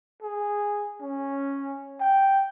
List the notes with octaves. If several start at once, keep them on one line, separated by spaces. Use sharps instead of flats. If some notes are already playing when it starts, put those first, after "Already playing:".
G#4
C#4
G5